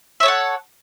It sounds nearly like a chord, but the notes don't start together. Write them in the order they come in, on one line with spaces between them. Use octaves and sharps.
E5 C#5 A4 F#5